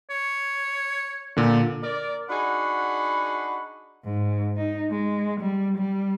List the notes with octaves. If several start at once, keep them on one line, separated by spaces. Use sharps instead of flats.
C#5
A#2 D3
A#4 D5
D4 D#4 F#4 G#4 F#5 B5
G#2
D#4
G#3
G3
G3